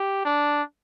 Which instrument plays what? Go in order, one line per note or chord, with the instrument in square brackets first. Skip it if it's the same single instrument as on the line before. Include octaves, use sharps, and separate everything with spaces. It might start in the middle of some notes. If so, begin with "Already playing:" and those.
Already playing: [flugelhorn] G4
D4